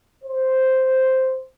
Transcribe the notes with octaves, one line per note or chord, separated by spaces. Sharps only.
C5